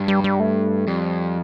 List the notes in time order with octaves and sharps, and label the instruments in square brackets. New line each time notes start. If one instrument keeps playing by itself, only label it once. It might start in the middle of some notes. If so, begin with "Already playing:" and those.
Already playing: [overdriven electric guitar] G2
[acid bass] G3
G3
A3
[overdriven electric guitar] F2 [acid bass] G3